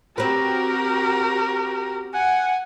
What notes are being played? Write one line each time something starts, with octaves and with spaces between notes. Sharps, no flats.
C4 F#4 G4 A#4 B4
F#5 G#5